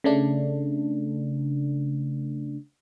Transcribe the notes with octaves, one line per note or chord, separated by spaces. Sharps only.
C#3 A3 D4